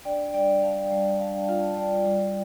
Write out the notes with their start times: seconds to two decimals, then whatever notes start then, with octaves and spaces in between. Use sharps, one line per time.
0.05 D4 D5 G5
0.34 G3 D5 G5
0.63 G3 F5 A5
0.91 G3
1.20 D4 F5 A5
1.49 F4 F5 A5
1.77 G3 D5 G5
2.06 G3